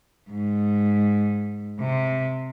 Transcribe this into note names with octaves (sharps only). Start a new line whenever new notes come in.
G#2
C3